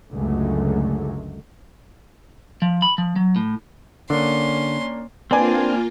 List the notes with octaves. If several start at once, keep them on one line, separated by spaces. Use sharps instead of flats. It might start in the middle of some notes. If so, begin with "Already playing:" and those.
C#2 F#2 D3 F#3 G#3 A3
F3
B5
F3
F#3
A2
D3 A#3 C#4 D4 C6
A#3 C4 D4 F4 B4 D5 G#5